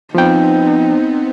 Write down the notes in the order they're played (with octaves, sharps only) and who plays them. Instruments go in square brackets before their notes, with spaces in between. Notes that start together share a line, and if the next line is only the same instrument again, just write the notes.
[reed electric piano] F3 G5 [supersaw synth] B3 C4 [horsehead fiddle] D#4